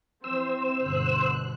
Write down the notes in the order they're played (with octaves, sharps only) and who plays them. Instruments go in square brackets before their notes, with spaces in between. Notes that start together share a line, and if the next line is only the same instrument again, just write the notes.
[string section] E3 C4 [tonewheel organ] C5 E6
[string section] G1 B2 F#6